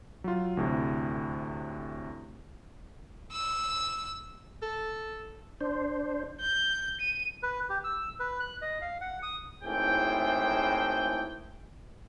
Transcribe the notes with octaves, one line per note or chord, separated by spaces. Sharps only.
F#3 F4
D2 A2 C3
E6
A4
D4 C5
G6
D#7
B4
G4
E6
B4
F#6
D#5
F5
F#5
D#6
G#1 A2 E3 G#4 C5 G5